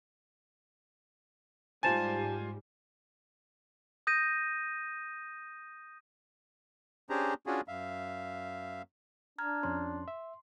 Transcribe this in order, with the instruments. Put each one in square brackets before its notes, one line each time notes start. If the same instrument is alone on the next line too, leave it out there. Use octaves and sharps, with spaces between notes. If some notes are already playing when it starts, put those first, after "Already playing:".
[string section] G#2 G3 [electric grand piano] F4 C5 G#5 [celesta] A5 A6 E7
[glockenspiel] D#6 G6 A#6 D#7
[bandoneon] C#4 D4 G4 G#4 C5 A#5
C#4 D4 F4 F#4 G#4
F#2 E5 F5
[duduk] D4 [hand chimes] A#5 F6 G#6
[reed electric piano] F2 C#4 [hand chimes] C6
[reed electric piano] E5